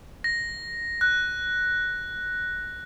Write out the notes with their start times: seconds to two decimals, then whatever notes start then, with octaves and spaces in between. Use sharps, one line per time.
0.24 A#6
1.01 F#6